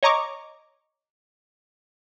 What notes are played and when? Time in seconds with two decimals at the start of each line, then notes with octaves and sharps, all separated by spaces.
0.03 C#5 D#5 A#5 C#6 D6